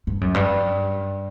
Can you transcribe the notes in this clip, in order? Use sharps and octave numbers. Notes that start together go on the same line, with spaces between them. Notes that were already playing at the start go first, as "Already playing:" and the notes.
G2
F#2
G2